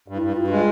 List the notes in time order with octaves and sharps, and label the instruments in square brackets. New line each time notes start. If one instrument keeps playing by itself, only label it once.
[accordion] G2
[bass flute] E4
[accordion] G2
[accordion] G2 [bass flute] F4
[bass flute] F#4
[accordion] G#3 [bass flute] F4